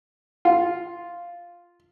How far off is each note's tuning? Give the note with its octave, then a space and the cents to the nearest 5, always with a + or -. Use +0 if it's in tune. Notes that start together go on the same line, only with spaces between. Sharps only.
F4 +0